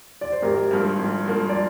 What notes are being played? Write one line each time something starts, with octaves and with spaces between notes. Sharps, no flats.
D5
C5
G#1 G4 A#4
G2 F3 A#3
G#1
G2 F3 A#3
D5